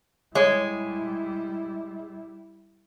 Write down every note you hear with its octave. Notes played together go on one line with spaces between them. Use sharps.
G3 G#3 E4 C#5